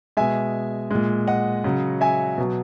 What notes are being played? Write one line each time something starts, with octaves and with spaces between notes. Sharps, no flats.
B2 G#3 E5 G#5
A#2 G#3
D#5 F#5
C#3 F#3
E5 G#5
B2 F#3